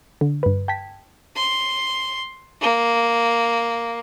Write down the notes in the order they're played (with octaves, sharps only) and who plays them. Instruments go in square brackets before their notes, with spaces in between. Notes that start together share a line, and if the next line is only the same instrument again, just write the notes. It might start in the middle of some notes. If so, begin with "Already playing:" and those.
[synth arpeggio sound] D3
G2 B4
G5 A5 G#6 B6
[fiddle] C6
A#3